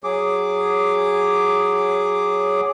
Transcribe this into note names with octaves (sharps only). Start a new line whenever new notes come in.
F#3 G#4 D6